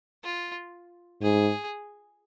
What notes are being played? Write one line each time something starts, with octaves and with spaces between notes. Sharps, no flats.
F4
G#2 G#4